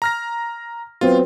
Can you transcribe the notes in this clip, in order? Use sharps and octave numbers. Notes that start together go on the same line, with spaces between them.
A#5 F6 A#6
F#3 B3 C4 F4